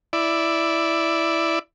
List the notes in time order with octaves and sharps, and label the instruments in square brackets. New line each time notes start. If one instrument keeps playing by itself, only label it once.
[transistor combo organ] E4 D5